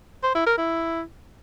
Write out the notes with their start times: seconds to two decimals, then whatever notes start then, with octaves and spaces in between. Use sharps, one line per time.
0.23 C5
0.35 E4
0.46 A#4
0.58 E4